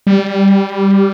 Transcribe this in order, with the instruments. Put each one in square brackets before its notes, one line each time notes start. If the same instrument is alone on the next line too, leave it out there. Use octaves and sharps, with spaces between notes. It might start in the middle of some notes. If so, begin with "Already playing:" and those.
[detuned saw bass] G3